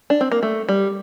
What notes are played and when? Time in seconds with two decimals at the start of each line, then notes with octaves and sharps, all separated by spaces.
0.10 D4
0.21 C4
0.32 A#3
0.43 A3
0.69 G3